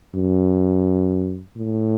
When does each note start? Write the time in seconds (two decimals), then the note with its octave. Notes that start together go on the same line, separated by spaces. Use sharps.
0.15 F#2
1.57 A2